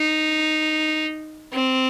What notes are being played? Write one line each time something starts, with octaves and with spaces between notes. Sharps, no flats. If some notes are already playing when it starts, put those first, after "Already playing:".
Already playing: D#4
C4